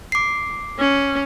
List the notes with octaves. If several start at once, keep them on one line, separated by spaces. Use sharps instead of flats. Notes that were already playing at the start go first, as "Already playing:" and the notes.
D6 C7
C#4